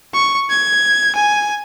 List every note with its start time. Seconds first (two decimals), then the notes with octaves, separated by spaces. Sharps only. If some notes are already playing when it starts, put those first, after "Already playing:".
0.14 C#6
0.50 G#6
1.15 G#5